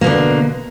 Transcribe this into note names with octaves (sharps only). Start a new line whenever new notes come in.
B2 D3 A#3